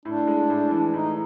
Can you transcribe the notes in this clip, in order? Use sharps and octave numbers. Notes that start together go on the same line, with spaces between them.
A2 D4
G#3
A2
E3
A2 D#4